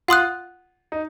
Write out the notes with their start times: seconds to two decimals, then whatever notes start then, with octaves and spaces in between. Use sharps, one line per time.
0.08 F4 F#5 C6 D#6 F#6
0.92 D#4